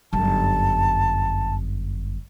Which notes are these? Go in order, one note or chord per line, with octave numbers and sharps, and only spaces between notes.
G1 F#2 A5